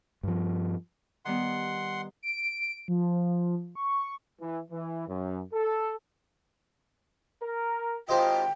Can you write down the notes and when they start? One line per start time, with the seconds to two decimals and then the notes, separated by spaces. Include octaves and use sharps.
0.23 G2 F3
1.25 D#3 G3 B3 F#5 C6
2.23 D7
2.88 F3
3.75 C#6
4.40 E3
4.71 E3
5.08 F#2
5.53 A4
7.42 A#4
8.09 G#1 F4 G4 C5 D#5 G5